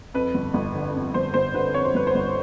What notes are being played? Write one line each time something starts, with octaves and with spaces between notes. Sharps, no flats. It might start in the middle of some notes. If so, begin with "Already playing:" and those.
F2 B4
G1
G1
D3
F2
G1 C5
G1 C5
D3 B4
F2 C#5
C5
G1 B4
C5
G1